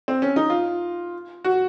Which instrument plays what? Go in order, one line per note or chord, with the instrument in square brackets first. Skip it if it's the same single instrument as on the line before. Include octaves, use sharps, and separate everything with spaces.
[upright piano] C4
C#4
D#4
F4
F#4